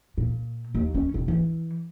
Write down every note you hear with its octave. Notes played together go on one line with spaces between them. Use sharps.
A#2
D#2
C#4
E1
E3